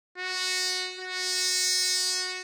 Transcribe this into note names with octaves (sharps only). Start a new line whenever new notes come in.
F#4
F#4